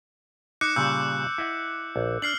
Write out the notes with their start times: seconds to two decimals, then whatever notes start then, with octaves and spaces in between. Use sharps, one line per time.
0.61 D#4 D6 F#6 C#7
0.76 A#2 C#3 G3 E6 G6
1.38 E4 D#5 F#5
1.96 A#1
2.22 D4 F6 C7 F#7